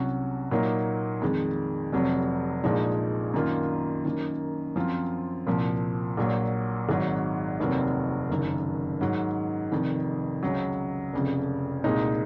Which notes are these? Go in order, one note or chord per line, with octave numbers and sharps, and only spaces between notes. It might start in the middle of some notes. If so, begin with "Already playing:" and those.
Already playing: C2 C3 F#3 C#4 F#4
A#2 F#3 A#3 D#4
F2 D#3 G#3
F1 F2 C3 F#3
A#1 A#2 F3 G#3 D#4
F#2 D#3 A#3 F4
F#2 D#3 A#3
F#2 F3 C4 F4
C2 A#2 F3
A#1 A#2 F#3
G#1 G#2 F#3
F1 D#2 D#3 F#3 C4
F#1 F#2 D#3
G#2 D#3 F#3
F1 F2 D#3
C#2 C#3 F#3
F1 F2 C#3
C2 A#2 G#3 D#4